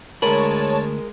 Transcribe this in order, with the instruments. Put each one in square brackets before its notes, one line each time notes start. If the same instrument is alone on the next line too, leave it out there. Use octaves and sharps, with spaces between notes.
[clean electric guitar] D2 B5 [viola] G#3 [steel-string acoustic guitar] A#4 G#5 [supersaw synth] C#5 A5